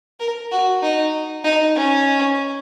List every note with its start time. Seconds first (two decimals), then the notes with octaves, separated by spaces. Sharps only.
0.20 A#4
0.51 F#4
0.82 D#4
1.44 D#4
1.75 C#4